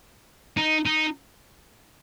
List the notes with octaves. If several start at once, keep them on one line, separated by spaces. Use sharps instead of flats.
D#4
D#4